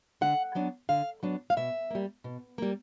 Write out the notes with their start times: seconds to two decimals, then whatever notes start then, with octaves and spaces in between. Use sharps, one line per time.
0.21 D3 F#5
0.55 F#3 B3 D4
0.89 D3 F5
1.23 F#3 B3 D4
1.50 F5
1.57 B2 E5
1.91 G3 A#3
2.24 B2
2.58 G3 A#3